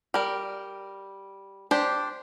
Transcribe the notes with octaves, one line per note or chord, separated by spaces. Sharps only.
G3 A#4
D4 G4 C5